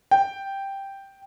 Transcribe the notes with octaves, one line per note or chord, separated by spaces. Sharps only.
G5